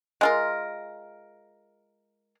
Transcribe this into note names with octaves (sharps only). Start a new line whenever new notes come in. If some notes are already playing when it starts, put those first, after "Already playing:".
G#3 F4 A#4